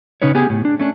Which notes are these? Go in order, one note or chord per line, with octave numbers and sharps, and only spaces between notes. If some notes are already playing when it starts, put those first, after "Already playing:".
C#3 C#4 D#4 B4 C#5
B3 G4 G#4 G#5
A2
D4
A3 C#4 D4